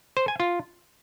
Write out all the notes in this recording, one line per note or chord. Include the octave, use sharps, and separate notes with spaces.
C5
G#5
F4